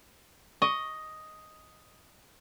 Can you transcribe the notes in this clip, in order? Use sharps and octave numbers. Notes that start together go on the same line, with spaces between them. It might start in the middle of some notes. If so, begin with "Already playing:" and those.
D#5 C#6